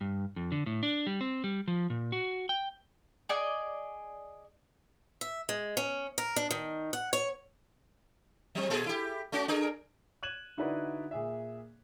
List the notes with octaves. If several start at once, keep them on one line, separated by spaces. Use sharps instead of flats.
G2
F2
D3
A2
D4
G3
C4
G3
F3
A#2
F#4
G5
G#4 D5 D#5
E5
G#3
C#4
A#4
D4
D#3
F#5
C#5
F#3 C4
A#2 G#4 A4
E4 G4
A3 C#4 F#4
D4 G#4 A#4
F#6 G#6 D#7 E7 F#7
D3 D#4 E4 F#4 B4 D5
A#2 G#4 E5